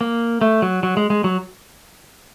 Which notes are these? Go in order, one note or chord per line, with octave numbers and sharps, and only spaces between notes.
A#3
A3
F#3
F#3
G#3
G#3
F#3